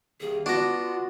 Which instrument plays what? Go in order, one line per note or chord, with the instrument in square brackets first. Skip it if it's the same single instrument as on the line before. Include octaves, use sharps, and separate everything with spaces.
[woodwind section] C2 D#3 A#3 [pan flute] G#4
[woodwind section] B3 [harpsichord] D4 A#5 [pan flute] F4 [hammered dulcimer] F#4